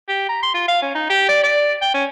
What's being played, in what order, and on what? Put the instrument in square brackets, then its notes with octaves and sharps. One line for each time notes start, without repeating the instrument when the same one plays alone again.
[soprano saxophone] G4
A#5
C6
F4
F5
C#4
D#4
G4
D5
D5
G5
C#4